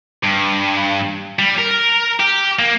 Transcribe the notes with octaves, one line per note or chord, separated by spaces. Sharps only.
G2
G3
A#4
G4
A#3